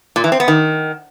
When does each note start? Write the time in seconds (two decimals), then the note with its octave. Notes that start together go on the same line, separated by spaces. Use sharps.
0.16 A#2
0.24 E3
0.32 C4
0.40 B3
0.48 D#3